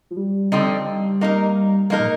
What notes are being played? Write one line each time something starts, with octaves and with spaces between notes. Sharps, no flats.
F3
G3
D3 F3 C4 D#4
A#3 D#4 A#4
F3 A#3 D#4 A#4
A#2